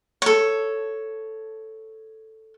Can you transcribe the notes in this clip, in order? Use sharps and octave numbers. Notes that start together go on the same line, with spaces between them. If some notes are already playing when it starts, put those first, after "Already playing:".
A4 C#5